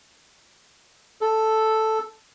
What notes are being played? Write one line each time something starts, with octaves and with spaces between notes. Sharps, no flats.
A4